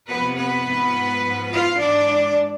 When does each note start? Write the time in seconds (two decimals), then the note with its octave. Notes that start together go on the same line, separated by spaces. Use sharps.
0.10 F2 C3 F3 B3 B4
0.38 B3 B4
0.67 G#2 F3
1.25 G#2 F3
1.53 F4 F5
1.81 G#2 E3 D4 D5